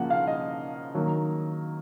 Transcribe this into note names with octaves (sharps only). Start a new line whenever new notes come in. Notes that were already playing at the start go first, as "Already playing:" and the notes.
Already playing: C#3 F3 A#3 F#5
F5
D#5
D#3 F#3 A#3